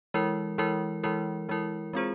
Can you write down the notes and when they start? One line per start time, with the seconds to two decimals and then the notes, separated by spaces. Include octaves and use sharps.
0.14 E3 G#3 E4 A#4
0.58 E3 G#3 E4 A#4
1.03 E3 G#3 E4 A#4
1.49 E3 G#3 E4 A#4
1.93 G#3 C4 F4 G#4 C5